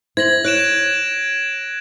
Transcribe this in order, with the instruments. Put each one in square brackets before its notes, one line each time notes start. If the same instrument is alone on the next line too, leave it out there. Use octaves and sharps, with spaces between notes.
[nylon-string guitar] E4 C5 [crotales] G#6 A#6 F#7
[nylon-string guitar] C#5 [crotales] F#6 D7 E7